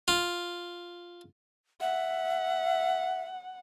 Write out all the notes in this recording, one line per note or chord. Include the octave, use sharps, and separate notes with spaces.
F4
E5 F#5